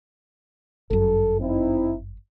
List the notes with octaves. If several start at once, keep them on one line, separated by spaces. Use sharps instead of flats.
G1 F#2 A4
C4 D#4 E4